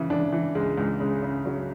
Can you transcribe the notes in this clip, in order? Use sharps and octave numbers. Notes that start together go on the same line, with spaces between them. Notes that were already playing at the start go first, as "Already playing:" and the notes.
Already playing: C#3 E3
E3 D4
E3
C#2 G#3
C#2
C#3 G#3
C#3
C#3 F#3